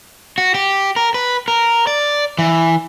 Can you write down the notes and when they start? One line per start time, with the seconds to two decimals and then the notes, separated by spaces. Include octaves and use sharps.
0.38 F#4
0.54 G4
0.96 A#4
1.14 B4
1.48 A#4
1.87 D5
2.39 E3